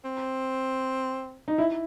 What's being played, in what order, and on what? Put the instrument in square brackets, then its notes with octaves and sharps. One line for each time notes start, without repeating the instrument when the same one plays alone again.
[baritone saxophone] C4
[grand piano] D#4
E4